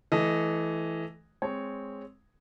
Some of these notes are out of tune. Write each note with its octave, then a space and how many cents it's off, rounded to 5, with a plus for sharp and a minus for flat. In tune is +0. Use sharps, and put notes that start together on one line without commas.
E3 +0 A3 -25 D#5 +0
G#3 -5 C4 +0 C#5 +0